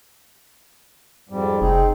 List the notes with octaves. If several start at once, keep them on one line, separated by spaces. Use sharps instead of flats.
F2 G#2 G3
F1 C4 D#4 G#4